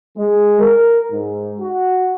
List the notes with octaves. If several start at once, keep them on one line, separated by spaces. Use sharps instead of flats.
G#3
A#4
G#2
F#4